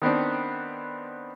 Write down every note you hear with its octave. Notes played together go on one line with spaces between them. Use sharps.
D#3 B3 C4 D4